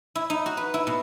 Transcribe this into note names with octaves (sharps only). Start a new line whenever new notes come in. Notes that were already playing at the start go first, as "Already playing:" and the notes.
E4
D#4
F#4
B4
E4
B2